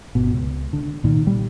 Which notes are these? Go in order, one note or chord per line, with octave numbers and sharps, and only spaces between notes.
G1 B2
C#2
D3
C2 A#2 D#3
A#2 G3